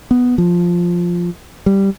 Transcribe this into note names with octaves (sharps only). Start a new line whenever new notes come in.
B3
F3
G3